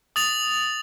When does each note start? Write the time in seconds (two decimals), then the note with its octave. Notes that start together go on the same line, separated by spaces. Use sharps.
0.16 D#6 A6 F7